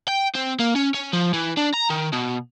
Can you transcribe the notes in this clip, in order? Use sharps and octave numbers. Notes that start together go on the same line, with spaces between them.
G5
C4
A#3
C#4
C#4
F3
E3
D4
A#5
D#3
B2